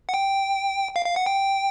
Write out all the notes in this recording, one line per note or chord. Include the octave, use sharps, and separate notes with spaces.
F#5
G5
F5
F5
F#5
G5